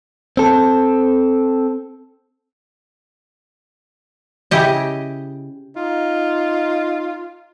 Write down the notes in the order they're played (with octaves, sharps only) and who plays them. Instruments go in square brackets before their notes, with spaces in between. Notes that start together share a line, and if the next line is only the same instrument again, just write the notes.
[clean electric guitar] C4 A4
[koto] C#3 E4 G4 D#5
[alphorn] D#4 [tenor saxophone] F4